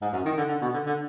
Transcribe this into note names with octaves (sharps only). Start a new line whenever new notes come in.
G#2
F#2
D#3
D3
D3
B2
D3
D3